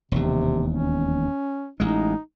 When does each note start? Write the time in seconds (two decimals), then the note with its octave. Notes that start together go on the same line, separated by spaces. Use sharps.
0.12 E1 D#2 C3
0.71 C#4
1.80 A1 G#3 D#4